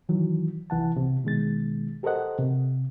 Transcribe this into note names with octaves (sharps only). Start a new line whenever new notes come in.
D#3 E3 F#3
C2 E3 F#5 A5
C3
B2 D#3 G#3 A6
G4 A4 A#4 C5 D#5 F#5
C3